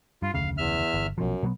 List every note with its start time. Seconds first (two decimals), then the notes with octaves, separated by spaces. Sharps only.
0.22 G2 F4
0.34 F1 D2 C#3 F5
0.58 E2 E5 F6
0.94 G1
1.18 A#1 F#2 B2 F3
1.43 B2 F#3 B3